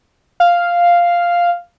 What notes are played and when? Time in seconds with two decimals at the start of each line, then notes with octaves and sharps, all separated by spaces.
0.40 F5